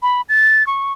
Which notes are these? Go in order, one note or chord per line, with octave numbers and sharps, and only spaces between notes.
B5
A6
C#6